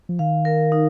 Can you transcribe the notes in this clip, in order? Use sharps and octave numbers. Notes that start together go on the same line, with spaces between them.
F3
D#3 F5
A#4
D#4